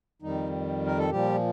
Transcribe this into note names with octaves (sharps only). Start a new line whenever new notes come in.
F2 D#3 G3 D#4
A#4
A4
A#2 F3 G3 G4